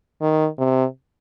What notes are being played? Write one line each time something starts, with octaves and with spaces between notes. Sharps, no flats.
D#3
C3